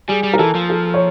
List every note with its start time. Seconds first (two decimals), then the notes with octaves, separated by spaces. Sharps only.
0.08 G3 G#4
0.23 G3
0.34 A#4
0.39 E3 A4
0.55 F3
0.70 A4
0.94 C#5